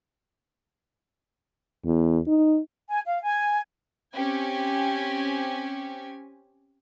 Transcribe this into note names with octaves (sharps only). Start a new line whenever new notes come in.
E2
D#4
G#5
F5
G#5
C4 C#4 G4 G#5